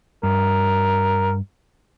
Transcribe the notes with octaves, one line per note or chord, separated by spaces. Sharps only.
G2 A#4